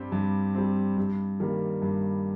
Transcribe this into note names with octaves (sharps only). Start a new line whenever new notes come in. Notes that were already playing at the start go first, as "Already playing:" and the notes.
Already playing: G2 G3 C4 G4
G2
G3 C4
G2
D#3 G3 A#3
G2